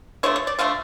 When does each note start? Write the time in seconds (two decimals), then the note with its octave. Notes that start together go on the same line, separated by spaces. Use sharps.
0.23 D3 F3 A3 C#5
0.36 C#5
0.47 D5
0.59 D3 F3 A3 F5